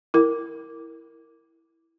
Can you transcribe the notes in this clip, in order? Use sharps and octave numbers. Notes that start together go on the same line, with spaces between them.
E4 A#4